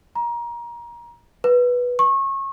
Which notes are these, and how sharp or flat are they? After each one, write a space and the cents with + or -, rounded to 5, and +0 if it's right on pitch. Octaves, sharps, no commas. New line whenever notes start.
A#5 +25
B4 -10
C#6 -30